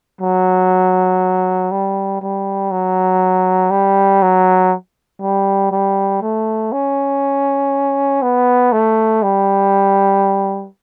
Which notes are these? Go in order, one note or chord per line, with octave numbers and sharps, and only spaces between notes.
F#3
G3
G3
F#3
G3
F#3
G3
G3
A3
C#4
B3
A3
G3